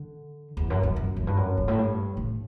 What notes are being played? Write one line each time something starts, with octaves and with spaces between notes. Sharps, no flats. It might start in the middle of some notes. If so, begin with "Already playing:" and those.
Already playing: D3
E2
F#2
F#2
F#2
F#2
G2
F#2
G2
A2
G2
A2